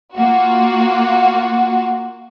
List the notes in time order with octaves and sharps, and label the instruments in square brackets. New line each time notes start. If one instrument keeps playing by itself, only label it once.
[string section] A#3 F4 F#4